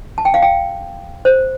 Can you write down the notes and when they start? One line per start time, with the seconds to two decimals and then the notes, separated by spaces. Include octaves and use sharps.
0.18 A5
0.25 G5
0.34 F5
0.42 G5
1.25 C5